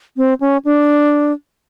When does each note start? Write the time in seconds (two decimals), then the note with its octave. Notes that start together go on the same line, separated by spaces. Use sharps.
0.17 C4
0.40 C#4
0.65 D4